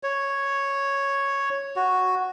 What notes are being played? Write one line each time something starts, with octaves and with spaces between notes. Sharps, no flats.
C#5
F#4